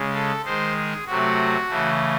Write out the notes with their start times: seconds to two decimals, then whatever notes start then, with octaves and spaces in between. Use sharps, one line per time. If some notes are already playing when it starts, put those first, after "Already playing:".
Already playing: C#3 G#3
0.14 A4
0.44 D#3 G#3 C5
0.76 G#4
1.06 C3 F#3 A3 F#4
1.69 C#3 E3 A3